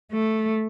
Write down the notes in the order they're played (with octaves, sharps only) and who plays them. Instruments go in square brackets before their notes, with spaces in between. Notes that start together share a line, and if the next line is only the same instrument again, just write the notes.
[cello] A3